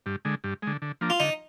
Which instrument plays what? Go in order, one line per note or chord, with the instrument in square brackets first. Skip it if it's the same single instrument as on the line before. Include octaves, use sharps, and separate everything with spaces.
[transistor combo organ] G2
D3 G#3
G2
D3 G#3
D3
F3 A#3 D4
[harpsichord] F4
[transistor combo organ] D3 [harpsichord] D#4